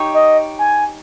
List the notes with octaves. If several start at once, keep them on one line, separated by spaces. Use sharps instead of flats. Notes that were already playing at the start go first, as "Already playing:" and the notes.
Already playing: D#4 G4 C#5
D#5
G#5